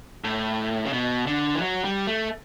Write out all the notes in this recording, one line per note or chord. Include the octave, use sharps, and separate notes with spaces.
A2
C#3
B2
D3
E3
F#3
G3
A3